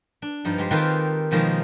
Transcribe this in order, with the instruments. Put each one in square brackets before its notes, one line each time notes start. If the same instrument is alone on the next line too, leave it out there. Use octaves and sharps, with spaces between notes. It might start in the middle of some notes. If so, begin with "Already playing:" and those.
[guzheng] D4
G2 F3 D#4
G#3 G4 C5
D#3 A#3 C4 F4 A4 B4
B2 D#3 F3 G#3 A#3